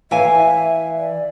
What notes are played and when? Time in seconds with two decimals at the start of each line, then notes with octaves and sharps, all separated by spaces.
0.11 E3 E5 F5 G#5
0.96 D5